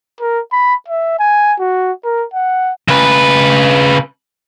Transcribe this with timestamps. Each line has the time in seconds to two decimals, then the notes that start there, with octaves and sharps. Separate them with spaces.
0.20 A#4
0.52 B5
0.88 E5
1.19 G#5
1.60 F#4
2.05 A#4
2.34 F#5
2.88 C#3 B4